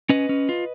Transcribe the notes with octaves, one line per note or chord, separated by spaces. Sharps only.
C#4 B4 D#5
C#4
F4